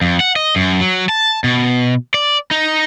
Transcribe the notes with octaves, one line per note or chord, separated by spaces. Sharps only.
F2
F#5
D#5
F#2
F#3
A5
B2
D5
D#4